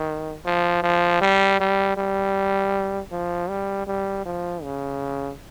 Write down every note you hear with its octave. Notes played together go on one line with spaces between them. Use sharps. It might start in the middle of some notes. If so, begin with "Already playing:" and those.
Already playing: D#3
F3
F3
G3
G3
G3
F3
G3
G3
F3
C#3